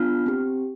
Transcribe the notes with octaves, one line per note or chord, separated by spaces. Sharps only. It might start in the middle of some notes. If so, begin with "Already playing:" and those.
Already playing: B3 D4 F4 F6
C4 G4